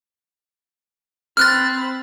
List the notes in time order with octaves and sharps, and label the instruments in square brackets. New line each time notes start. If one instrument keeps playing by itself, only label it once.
[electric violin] C4 B5 [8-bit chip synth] F6 F#6 A6